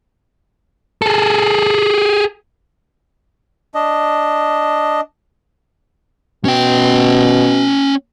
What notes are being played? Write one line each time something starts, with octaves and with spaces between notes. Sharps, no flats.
G#4 A4
D4 D#5
B2 C#4 G5